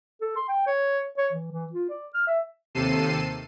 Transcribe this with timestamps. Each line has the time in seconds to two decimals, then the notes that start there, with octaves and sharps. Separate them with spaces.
0.21 A4
0.36 C6
0.48 G5
0.67 C#5
1.18 C#5
1.33 E3
1.52 E3
1.72 F4
1.89 D5
2.14 F6
2.27 E5
2.75 D#2 C3 A4 C7 D#7 E7